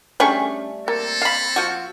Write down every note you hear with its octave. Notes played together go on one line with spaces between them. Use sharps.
G3 A3 C#4 D4 G#4 C#6
A#3 C4 A4
F5 B5
F3 F#4